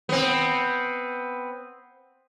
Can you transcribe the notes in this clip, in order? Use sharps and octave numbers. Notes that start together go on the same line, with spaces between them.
B3 C4